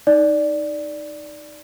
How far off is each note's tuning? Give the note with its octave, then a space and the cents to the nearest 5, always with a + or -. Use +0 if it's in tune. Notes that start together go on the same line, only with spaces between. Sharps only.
D#4 +0 D5 +0